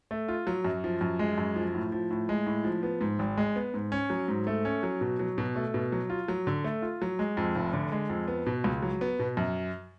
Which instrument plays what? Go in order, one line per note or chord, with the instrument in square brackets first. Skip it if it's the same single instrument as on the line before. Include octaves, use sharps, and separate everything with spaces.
[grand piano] A3
F4
F#3
F#2
F3
F#2
G#3
F#2
F3
A2
F3
A2
G#3
A2
F3
B3
G#2
G#1
G#3
B3
G#2
C#4
F#3
G#2
A3
C#4
F#3
B2
F#3
B2
A3
B2
F#3
F4
F#3
D3
A3
F4
F#3
G#3
F2
F1
D3
G#3
F2
B3
B2
C#2
F#3
B3
B2
F#2